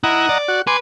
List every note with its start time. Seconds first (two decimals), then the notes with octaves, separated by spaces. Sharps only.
0.04 E4 D#5 F#5 A#5
0.29 D5
0.48 F#4
0.67 B4 G#5 C6 D6